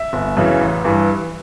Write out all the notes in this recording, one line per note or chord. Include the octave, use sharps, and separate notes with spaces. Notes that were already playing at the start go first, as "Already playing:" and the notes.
Already playing: E5
G1
F#2 C#3 E3
A1
G2 E3